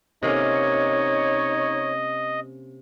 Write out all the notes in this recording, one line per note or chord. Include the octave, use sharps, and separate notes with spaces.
C3 A#3 C#4 D#4 C#5 D#5